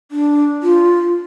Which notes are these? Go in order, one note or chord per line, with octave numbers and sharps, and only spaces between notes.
D4
F4